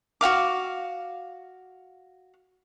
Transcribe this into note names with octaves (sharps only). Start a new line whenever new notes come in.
F#4 E5 F5 D6